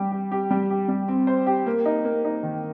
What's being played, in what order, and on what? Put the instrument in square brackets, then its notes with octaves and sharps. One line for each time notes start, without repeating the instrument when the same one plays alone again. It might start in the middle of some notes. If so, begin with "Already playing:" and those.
Already playing: [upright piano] G3 G4
G4
G4
G3
G4
G3
C4
C5
G4
A#3
D#4
A#3
D#4
D#3